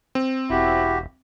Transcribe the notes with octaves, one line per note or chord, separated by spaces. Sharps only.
C4
E1 E4 F#4 G4